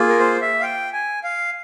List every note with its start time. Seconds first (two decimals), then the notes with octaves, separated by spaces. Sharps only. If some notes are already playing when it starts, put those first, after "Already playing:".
Already playing: A#3 F4 G#4
0.09 A#4
0.20 C5
0.41 E5
0.60 F5
0.63 G5
0.93 G#5
1.24 F5